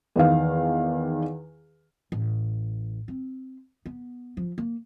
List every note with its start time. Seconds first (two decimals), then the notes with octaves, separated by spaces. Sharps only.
0.16 E2 D#3 F5
2.12 A1
3.08 C4
3.86 B3
4.37 F3
4.58 A#3